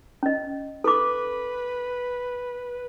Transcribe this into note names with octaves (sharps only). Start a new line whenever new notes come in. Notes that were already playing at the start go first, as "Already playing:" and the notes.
C#4 D#5
A4 B4 D6